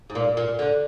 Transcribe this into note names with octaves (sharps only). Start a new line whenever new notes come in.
G#2
A#2
A#2
D3